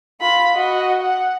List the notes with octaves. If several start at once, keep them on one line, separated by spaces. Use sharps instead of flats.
F4 B5
F#4 D#5
F#5